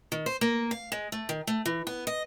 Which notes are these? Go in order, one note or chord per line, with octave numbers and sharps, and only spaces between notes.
D#3
C5
A#3
F5
G#3
A3
D#3
A3
E3
B3
D#5